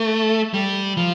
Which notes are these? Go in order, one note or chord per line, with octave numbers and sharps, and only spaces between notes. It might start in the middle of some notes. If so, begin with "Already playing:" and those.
Already playing: A3
G3
F3